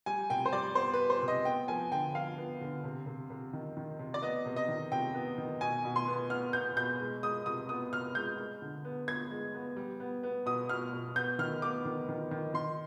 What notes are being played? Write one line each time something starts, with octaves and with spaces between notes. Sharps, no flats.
G3 G#5
C3 G5
C5
G3 D5
B3 C5
B4
G3
C5
C3
D#5
B3 G5
F3 G#5
D3 G5
F3 F5
B3
D3
C3
C3
C3
D#3
D#3
C3
D5
B3 D#5
C3
D#5
D#3
C3 G5
B3
D#3
B2 G#5
B2
C6
B3
B3 F6
B3 G6
B2 G6
G#3
G#3 D#6
C3 D#6
B3 D#6
C3 F6
G#3 G6
G#3
D3
B3
B3 G#6
G#3
B3
G3
B3
B3
B2 D#6
B2 F6
B2
B3 G6
D#3 F6
B3 D6
D#3
D#3
D#3
D#3 C6